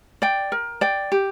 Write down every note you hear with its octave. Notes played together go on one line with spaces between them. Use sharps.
D5 G5
A#4
D5 G5
G4